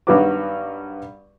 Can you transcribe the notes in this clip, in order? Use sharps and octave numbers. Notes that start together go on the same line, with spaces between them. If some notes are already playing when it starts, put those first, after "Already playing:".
G2 D#3 F#3 B3 F#4 D6